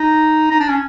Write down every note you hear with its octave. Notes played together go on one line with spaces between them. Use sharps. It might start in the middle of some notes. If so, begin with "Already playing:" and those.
Already playing: D#4
D#4
D4
C#4